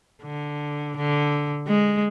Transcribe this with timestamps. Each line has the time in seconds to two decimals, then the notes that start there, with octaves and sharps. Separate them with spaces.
0.24 D3
0.97 D3
1.68 G#3